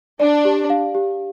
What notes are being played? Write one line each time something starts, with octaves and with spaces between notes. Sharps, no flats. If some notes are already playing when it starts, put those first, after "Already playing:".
D4 D5
G4
F5
G4